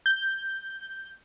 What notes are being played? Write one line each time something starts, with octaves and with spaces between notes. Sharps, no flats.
G6